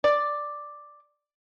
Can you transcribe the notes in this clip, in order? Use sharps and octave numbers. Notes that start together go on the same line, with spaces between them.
D5